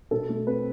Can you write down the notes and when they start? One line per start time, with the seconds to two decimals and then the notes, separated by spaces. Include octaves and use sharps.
0.11 B2 A4
0.29 A3
0.46 C4 B4